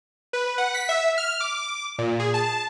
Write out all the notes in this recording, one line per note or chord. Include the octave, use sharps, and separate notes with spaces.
B4
F#5
B6
E5
F6
D6
A#2
G#4
A5